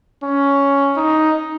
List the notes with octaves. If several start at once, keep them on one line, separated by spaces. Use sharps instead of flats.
C#4
D#4